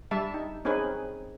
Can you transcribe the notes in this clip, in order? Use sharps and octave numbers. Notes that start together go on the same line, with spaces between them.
G3 E5 A5
D#4
C4 C#4 D#4 G#4 B4